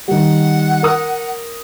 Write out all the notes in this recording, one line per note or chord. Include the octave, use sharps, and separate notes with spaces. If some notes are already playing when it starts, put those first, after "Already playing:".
D#3 G3 F#5
A#4 D#6